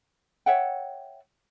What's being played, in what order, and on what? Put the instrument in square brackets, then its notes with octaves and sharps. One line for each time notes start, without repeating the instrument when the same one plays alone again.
[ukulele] C#5 E5 F#5 G5